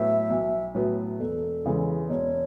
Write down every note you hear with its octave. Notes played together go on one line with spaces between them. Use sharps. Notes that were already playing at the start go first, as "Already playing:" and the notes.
Already playing: A2 F#3 B3 E5
B1
A2 F#3 B3
E1 A4
E2 C#3 E3 G#3
E1 C#5